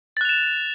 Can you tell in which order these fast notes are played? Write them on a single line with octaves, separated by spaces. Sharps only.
A6 F#6 F7 E7